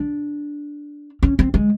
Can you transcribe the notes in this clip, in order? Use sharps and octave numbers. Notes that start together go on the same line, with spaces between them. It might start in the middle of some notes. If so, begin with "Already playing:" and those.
Already playing: D4
C#4
C4
G#3